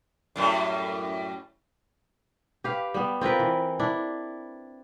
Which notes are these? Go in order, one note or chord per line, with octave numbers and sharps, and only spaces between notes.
F#2 A2 G3
G4 B4 F5
G3 B3
C4 F4 A#4 B4
E3
D4 E4